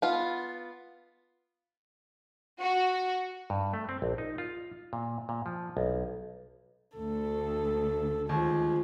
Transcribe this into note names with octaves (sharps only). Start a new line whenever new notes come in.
B3 F4
F#4
G2
A3
C4
A#1
D#4
F4
A#2
A#2
F3
B1
D2 A4
D#2 F3 G#3